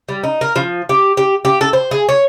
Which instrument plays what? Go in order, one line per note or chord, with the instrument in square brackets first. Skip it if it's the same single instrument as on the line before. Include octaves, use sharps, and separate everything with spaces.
[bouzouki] G3
D#4
A#4
F3
G4
G4
G4
A4
C5
G#4
C#5